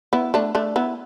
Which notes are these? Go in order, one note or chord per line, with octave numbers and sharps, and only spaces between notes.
B3 E4
A3 D4
A3 D4
B3 E4